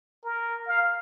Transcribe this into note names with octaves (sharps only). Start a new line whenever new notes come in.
A#4
F5